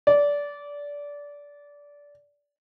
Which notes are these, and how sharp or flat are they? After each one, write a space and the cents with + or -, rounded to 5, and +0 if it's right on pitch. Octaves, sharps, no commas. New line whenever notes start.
D5 -20